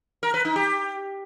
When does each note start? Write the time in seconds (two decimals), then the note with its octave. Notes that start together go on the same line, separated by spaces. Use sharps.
0.23 A#4
0.34 B4
0.45 D#4
0.56 G4